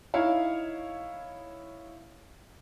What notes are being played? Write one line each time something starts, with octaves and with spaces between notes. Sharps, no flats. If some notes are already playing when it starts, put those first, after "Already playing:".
D#4 E4 C#5 F5